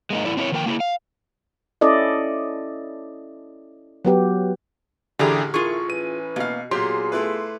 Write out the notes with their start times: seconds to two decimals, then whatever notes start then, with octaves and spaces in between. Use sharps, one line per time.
0.10 G#3 A#3 D#4
0.25 E2 A2 E4 A4 D5
0.37 C4 D4 E4 G4 A#4 C#5
0.52 D#3 F3 A#3 A#4 E5 G5
0.66 A#3 E4 G4 G#4
0.80 F5
1.81 C#4 E4 A4 D5 D#5
4.05 F#3 B3 G4
5.19 A1 D3 E3 G4 G#4 D5 A#5
5.54 E4 F4 G#4 A#4 C#6
5.90 E3 C#4 B4 D#7
6.36 B2 A#3 F5 F6
6.71 A#2 F#3 B3 F4 G4 G#4 C6
7.12 A3 E4 B4